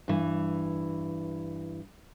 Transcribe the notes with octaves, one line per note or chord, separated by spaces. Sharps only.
G2 E3